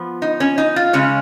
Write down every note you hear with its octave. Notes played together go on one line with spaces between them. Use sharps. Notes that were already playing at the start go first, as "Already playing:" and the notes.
Already playing: F3 B3
D#4
C#4
D#4
F4
C#3 G#3 C#4 C#5